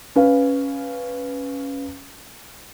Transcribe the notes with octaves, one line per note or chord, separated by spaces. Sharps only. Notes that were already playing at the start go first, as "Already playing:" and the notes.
C#4 B4 F5